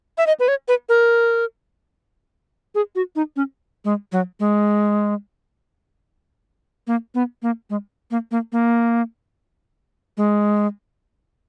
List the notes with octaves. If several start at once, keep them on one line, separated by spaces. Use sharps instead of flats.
E5
D#5
B4
C#5
B4
A#4
G#4
F#4
D#4
C#4
G#3
F#3
G#3
A#3
B3
A#3
G#3
A#3
A#3
A#3
G#3